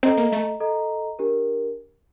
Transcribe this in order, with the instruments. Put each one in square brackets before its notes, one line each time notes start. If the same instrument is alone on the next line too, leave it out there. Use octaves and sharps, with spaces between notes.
[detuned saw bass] C4 [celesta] A4 D#5 A#5
[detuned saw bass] A#3
A3
[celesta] A4 D#5 A#5
D4 G4 A#4